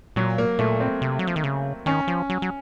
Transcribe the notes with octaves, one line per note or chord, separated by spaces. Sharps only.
A#2 F#3
A#3
A#2 A3
C4
C3
F#3
F3
D#3
C#3
D#3 C#4
F3
F#3
F#3